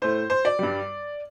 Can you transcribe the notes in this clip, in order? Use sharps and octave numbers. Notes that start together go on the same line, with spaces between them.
A2 A3 C5
C5
D5
G2 G3